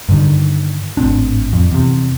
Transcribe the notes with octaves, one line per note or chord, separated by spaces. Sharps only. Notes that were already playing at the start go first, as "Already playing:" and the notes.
G2 D3 D#3
G#1 A2 C4 D4
F2
E2 C3